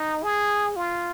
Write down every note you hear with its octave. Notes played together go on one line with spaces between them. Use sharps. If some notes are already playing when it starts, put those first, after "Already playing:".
Already playing: D#4
G#4
F4